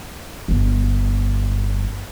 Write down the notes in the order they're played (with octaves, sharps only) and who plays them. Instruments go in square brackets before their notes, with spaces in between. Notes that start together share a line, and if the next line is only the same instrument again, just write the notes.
[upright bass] G1 G2